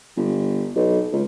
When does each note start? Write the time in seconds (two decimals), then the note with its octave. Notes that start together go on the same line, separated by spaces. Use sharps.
0.17 G1
0.76 B1
1.12 C#2